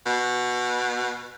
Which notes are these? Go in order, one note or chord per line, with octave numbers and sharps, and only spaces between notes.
B2